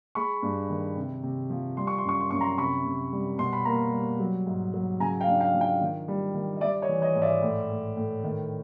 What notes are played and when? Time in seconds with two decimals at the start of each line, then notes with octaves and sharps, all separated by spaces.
0.15 G#3 B5 C#6
0.43 G2
0.70 D#3
0.97 C3
1.23 C3
1.50 F3
1.77 G3 C6
1.87 C#6
1.98 C6
2.05 F#2 C#6
2.21 C6
2.30 F#2 C#6
2.41 A#5 C6
2.57 C3 B5 C#6
2.85 C3
3.12 G3
3.38 B2 C6
3.53 B5
3.65 A#3 A#5 C6
3.92 G3
4.20 F#3
4.47 G#2
4.74 F#3
5.00 C#3 G#5 A#5
5.21 F5 G5
5.28 D4
5.41 F5 G5
5.54 F3
5.61 F5 G5
5.81 D#3
6.08 G3
6.34 D#3
6.56 D#5
6.61 G3 D5 E5
6.82 C#5 D#5
6.89 E3
7.02 C#5 D#5
7.15 G#2
7.22 D5 E5
7.42 A2
7.70 A2
7.97 A2
8.24 D#3